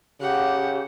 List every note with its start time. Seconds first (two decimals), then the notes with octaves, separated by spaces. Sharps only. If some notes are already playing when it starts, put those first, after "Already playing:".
0.21 C#3 G4 F#5